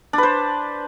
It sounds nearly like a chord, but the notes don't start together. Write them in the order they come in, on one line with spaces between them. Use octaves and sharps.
D4 B4 C5